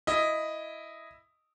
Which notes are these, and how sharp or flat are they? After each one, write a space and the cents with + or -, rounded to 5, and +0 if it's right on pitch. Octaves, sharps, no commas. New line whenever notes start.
E4 +0 D#5 +0